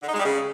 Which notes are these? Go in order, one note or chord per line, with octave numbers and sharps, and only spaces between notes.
D3
D#4
G#3
G3
C#3